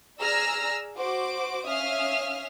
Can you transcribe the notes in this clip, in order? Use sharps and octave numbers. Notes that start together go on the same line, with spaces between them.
G#4 D5 A#5 E6 F6 A#6
F#4 C5 D6
C#4 E5 F5 D#6 F6